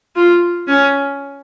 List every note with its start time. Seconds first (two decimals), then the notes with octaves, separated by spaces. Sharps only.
0.16 F4
0.68 C#4